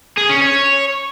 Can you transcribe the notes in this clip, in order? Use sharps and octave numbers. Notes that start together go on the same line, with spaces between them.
G#4
C#4
C#5